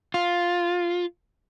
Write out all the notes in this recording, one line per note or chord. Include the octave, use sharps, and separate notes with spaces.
F4